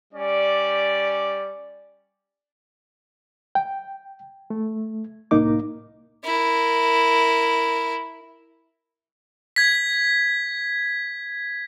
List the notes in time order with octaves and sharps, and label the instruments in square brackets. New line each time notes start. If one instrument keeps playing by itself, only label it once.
[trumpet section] G3 C#4 D5
[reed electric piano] G5
A3
C2 A2 A#3 D#4 D6
[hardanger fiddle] E4 A#4
[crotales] G#6 B6